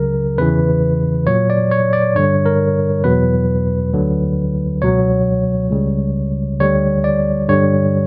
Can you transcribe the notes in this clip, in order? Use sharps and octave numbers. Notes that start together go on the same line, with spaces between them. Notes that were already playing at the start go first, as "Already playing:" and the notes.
Already playing: C#2 C#3 F#3 A#4
E2 C#3 E3 B4
A#2 F#3 C#5
D5
C#5
D5
G2 D3 G3 C#5
A#4
E2 B2 F#3 B4
D2 D3 F#3
C#2 B2 F#3 C#5
C#2 C#3 G3
D2 D3 G3 C#5
D5
G2 D3 G3 C#5